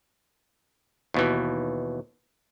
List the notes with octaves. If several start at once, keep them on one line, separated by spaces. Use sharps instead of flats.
D#2 B2 E3